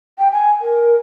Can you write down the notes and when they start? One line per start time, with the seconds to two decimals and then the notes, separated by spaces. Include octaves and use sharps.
0.18 G5
0.32 G#5
0.61 A#4